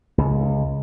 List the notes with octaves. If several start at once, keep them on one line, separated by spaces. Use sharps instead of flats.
C#2